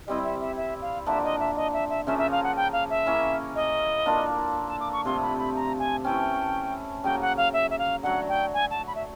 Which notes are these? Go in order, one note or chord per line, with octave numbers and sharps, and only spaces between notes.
G3 C4 E4 D#5
E5
E5
E5
F5
D3 F3 A#3 D4 E5
D#5
E5
D#5
E5
E5
C#3 F3 A#3 C#4 E5
E5
F5
F#5
G5
F5
E5
A#3 C#4 E4
D#5
A#3 D4 F4 A4
A5
D6
C#6
C3 F3 A3 C6
B5
B5
A#5
G#5
E3 A3 C#4 G5
C#3 F#3 A#3 G5
F#5
F5
E5
E5
F5
D3 F#3 A3 F#5
G5
G#5
A5
B5
E5